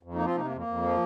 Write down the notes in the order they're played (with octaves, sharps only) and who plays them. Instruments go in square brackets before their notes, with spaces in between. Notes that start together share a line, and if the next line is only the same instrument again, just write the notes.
[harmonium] F2
A#3 D#4
F3
C4 F4
C3 A#3 D#4
A#3
F2
A#3
F2
F3